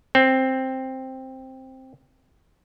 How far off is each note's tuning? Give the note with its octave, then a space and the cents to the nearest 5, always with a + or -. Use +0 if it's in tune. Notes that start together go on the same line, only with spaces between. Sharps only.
C4 +5